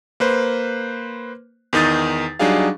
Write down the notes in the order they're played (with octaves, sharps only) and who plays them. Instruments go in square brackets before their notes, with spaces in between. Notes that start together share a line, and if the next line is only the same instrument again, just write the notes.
[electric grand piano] A#3 B4 C5
E2 D#3 D#4 D#6 A6
F#3 G3 D4 D#4 G#4 F5